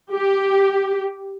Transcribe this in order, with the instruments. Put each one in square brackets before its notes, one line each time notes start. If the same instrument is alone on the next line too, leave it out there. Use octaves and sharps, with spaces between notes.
[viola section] G4